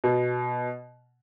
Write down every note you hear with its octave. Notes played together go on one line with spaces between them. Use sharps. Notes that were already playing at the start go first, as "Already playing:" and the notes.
B2